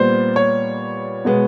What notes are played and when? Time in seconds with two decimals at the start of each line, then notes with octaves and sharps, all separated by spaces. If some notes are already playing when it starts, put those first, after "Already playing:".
Already playing: A#2 G3 B3 C5
0.36 C#5
1.25 B2 G#3 B3